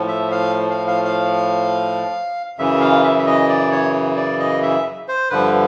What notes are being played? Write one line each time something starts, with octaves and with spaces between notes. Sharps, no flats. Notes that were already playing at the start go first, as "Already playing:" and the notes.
Already playing: A2 F3
E5
F5
F5
F5
F5
F#2 C#3 E3 E5
F5
E5
E5
D#5
D5
C#5
D5
D#5
E5
C5
G2 D3 F3 B4